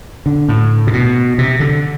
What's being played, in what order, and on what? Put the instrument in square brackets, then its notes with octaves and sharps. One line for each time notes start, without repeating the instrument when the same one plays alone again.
[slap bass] D3
A2
C3
B2
C3
D3